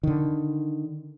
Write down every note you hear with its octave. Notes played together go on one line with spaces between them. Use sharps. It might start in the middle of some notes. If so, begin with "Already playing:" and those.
D3 D#3